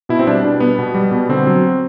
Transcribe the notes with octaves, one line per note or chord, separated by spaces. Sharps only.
B2 E4
C4
G3 D4
B2 D4
G3 B3
B2
G3
B2
D3 C4
F#3